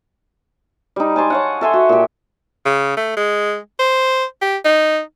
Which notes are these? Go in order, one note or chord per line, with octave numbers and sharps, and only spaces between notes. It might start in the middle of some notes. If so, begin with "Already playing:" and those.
G3 D#4
G#5 A5 C6 D6
C#5 F5 F#5
A4 E5 G#5 C6
F#4
A#2 G4
C#3
A3
G#3
C5
G4
D#4